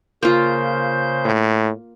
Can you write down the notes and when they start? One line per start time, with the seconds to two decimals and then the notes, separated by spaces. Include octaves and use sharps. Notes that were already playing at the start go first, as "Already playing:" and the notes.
0.23 C#3 A#3 F4 C5 G6
1.25 A2